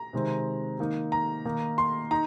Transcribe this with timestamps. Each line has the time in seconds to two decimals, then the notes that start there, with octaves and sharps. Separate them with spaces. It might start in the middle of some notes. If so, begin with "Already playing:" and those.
Already playing: A#5
0.13 C3 D#3 G#3 C4
0.79 D#3 A#3 D#4
1.12 A#5
1.45 D#3 A#3 D#4
1.78 C6
2.11 D#4 A#5